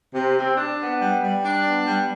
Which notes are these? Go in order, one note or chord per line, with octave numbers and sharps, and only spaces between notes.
C3
C4
D4
B3
G3
G3
D4
B3
G3